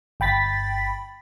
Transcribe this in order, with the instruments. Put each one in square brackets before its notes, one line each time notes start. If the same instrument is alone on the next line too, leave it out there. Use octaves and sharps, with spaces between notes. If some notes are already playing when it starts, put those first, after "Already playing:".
[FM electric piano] G1 G5 B5 A6 B6